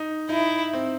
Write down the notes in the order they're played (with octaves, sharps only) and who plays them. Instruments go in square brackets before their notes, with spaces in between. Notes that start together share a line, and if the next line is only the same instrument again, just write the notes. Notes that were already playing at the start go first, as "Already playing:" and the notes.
Already playing: [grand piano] D#4
[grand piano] D#4 [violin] E4
[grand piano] C4